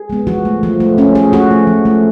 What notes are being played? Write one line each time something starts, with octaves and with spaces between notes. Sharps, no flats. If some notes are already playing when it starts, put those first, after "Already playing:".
Already playing: G#4
G#3 B3
F3 F#4
A3
F3
A3
F3 C#4
A3 G#4
F3 F#4
A3
F3
A3